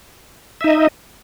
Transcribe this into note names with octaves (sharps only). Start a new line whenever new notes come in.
D#4 D#5 E5